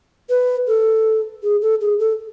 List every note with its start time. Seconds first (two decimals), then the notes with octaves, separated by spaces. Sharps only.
0.29 B4
0.67 A4
1.43 G#4
1.62 A4
1.81 G#4
1.99 A4